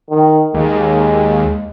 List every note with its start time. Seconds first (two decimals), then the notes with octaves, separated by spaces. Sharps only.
0.10 D#3
0.54 D#2 G#3